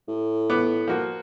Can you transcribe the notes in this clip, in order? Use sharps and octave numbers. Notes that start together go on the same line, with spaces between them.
A2
B3 D6
F3 A#3 F#4